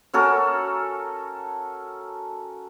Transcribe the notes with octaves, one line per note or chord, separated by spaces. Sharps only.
C#4 F#4 A4 A#4